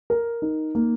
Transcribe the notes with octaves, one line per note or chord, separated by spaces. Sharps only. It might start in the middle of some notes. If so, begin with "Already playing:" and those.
A#4
D#4
A#3